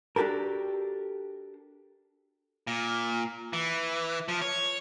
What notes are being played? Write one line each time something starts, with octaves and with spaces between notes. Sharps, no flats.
D4 F#4 G4 A4 A#4
A#2
E3
F3
C#5